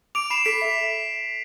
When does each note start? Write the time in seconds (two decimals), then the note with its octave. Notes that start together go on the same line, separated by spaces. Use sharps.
0.15 D6 D7 F7
0.30 B5 C7 E7
0.45 A4 B6 D7
0.61 E5 B6